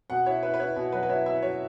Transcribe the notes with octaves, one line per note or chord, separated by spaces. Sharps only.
B2 F#5
E4 C#5
E4 B4
B4
E4 C#5
B2
F#3 B4
B4
E4 C#5
E4 E5
F#3 C#5